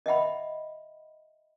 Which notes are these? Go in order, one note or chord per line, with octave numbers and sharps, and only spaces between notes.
D#5 E5 F#5 B5